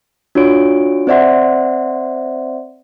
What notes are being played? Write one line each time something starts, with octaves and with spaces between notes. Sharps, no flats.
D4 F4 F#4 C#5 D7
C4 C5 D5 E5 F#5 C6